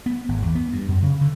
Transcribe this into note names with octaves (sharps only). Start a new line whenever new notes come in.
B3
G#1
E2
B3
G2
F#2
C#3
D3